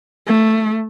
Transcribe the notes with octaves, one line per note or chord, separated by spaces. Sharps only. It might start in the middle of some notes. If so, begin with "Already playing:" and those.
A3